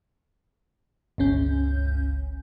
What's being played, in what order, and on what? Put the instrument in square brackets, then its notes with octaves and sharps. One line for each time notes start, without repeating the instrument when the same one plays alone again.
[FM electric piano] G1 C#2 C#3 C#4 G6